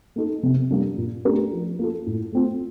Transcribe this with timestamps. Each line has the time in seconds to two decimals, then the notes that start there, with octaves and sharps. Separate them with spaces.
0.16 A#3 D#4 A4
0.43 C3
0.71 G3 A#3 D4
0.98 A#2
1.25 A3 D4 G4 A#4
1.52 F3
1.79 A#3 F4 A4
2.06 A2
2.32 A3 C4 F4